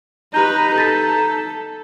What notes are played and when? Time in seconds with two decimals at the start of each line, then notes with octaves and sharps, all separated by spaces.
0.34 D#4 G4 B4 D#5 A#5 G6
0.76 A4 G6 A6 B6